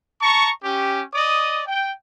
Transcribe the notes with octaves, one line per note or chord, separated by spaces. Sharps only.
A5 A#5 C#6
C#4 G4
D5 D#5 D#6
G5